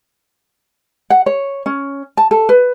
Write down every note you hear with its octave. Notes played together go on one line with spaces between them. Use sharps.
F#5
C#5
C#4
A5
A4
B4